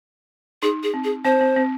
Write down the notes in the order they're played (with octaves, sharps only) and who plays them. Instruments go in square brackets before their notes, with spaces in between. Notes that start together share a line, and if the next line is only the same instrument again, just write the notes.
[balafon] D#4 [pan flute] G#4
[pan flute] G#4
[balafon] C4
[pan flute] G#4
[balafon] C4 [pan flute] C5
[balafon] C4
C4